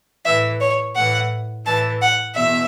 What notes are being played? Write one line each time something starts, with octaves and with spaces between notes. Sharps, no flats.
A2 E3 E5
C#5
A2 E3 F#5
A2 E3 A5
F#5
E2 B2 E5